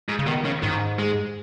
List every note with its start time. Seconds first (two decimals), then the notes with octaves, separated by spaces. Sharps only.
0.09 G#2
0.19 C#3
0.26 B2 D#3
0.45 C#3
0.63 G#2 D#3
0.99 G#3